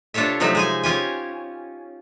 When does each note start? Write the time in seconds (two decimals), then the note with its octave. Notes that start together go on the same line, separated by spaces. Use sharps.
0.14 C3 D4 F4 A4 C#5 E5
0.40 C3 F3 F#3 A3 D#4 E5
0.55 G#3 G#4 G#5
0.83 C#4 F4 G4 G#5